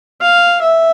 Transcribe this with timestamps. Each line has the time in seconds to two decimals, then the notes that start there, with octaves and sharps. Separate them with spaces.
0.21 F5
0.61 E5